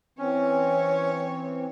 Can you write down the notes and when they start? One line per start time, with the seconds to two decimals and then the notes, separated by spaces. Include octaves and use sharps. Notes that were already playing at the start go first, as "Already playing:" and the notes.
0.19 E3 C4 C#4 C#5